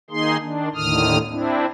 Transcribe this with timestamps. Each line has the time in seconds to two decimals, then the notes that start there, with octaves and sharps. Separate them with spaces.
0.10 D#3 A#3 D#4 G#4 C6
0.41 D#3 D4
0.75 D#2 A2 D3 D#3 D#6 F6
1.30 C4 D4 E4